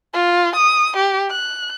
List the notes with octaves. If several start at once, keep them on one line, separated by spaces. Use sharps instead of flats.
F4
D#6
G4
F#6